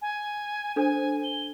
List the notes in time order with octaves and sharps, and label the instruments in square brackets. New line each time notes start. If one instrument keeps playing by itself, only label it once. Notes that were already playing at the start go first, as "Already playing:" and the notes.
[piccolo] G#5
[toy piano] D4 A4 C5 [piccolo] G#5
[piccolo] G7